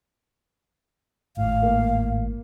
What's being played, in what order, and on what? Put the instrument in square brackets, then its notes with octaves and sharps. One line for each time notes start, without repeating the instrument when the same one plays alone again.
[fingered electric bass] G#1 A2 [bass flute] F5
[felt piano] A#3